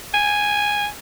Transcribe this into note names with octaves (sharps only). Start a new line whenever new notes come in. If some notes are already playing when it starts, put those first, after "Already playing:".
G#5